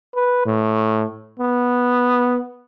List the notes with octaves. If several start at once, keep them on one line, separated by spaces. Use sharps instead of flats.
B4
A2
B3